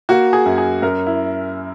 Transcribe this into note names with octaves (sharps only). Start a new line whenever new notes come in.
A#3 F#4
G#4
F#2
G#4
F#2 A#4
E4